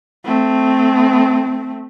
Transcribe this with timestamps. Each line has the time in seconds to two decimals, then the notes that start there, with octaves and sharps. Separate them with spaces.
0.24 A3 C4